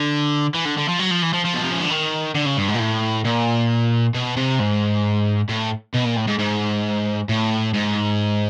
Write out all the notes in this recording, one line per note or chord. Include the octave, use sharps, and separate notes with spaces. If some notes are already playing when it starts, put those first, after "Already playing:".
Already playing: D3
E3
D3
D3
F3
F#3
F3
E3
F3
F3
B2
C3
C#3
D3
D#3
D3
C#3
G2
G#2
A#2
A2
A#2
B2
C3
G#2
A2
B2
A#2
A2
G#2
G#2
A2
G#2